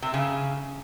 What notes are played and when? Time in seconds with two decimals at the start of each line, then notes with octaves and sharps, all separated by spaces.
0.02 C3
0.14 C#3